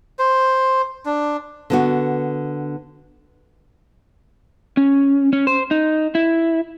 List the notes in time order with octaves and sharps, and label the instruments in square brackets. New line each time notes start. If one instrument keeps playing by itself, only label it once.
[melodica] C5
D4
[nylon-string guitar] D3 B3 F#4
[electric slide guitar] C#4
C#4
C5
D#4
E4